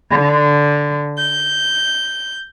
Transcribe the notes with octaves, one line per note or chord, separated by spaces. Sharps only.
D3
G6